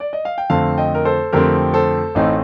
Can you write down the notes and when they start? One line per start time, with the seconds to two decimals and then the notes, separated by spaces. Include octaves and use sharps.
0.00 D5
0.13 D#5
0.25 F5
0.38 G5
0.50 F2 D3 A3 C4 F5 A5
0.78 D#5 G5
0.95 A#4
1.05 A4 C5
1.33 F2 D3 A3 C4 G4 A#4
1.74 A4 C5
2.15 A1 A2 A3 C4 D#4